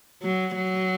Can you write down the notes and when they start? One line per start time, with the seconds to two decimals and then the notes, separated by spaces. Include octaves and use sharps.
0.23 F#3
0.55 F#3